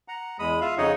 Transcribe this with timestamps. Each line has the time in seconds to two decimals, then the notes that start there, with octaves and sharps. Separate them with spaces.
0.08 F#5 A#5
0.39 E2 G#3 B5 D#6
0.61 F4 E5 F5
0.78 F2 C#3 D#4 C#5 D#5 F#5